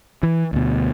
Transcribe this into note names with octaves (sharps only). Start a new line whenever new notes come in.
E3
D2 B2